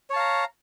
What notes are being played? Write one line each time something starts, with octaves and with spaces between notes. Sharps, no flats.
C#5 F5 A5 A#5